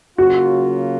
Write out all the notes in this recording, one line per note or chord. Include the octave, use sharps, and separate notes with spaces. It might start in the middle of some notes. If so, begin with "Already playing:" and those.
C#3 F#3 A#3 F4 F#4